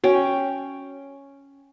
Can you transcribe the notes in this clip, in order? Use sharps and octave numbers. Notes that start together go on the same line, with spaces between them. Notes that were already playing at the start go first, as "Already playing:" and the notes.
C#4 F#4 G5